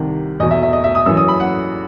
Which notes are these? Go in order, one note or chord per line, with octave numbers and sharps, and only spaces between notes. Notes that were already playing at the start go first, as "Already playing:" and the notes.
Already playing: C2 C3 D#3
E2 B2 D#5
E5
E5
D#5
E5
D#6
F#2 E3 E6
D#6
B5
F#5